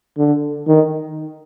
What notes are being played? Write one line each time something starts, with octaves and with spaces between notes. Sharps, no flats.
D3
D#3